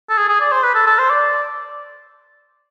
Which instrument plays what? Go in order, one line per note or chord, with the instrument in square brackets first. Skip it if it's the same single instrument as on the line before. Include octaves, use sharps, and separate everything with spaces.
[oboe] A4
G#4
G#4
D5
C5
B4
A4
A4
C5
D5